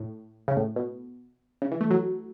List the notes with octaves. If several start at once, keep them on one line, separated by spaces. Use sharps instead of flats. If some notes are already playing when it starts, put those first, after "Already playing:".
Already playing: A2
C#3
A2
B2
C#3
E3
A3
F#3